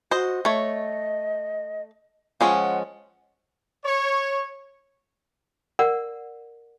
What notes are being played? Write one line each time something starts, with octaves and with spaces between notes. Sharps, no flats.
F#4 C5 D#5
A3 C#5 D#5
F3 G#3 C#4 F#5
C#5
A#4 D5 F#5